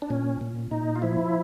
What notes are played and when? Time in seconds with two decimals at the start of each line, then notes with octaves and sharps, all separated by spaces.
0.02 D4
0.10 A#2 C#4
0.41 A#2
0.71 A#2 D#4
0.96 F4
1.02 F3 E4